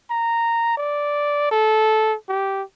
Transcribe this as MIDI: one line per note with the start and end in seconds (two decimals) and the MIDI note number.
0.10 0.77 82
0.77 1.49 74
1.52 2.15 69
2.29 2.63 67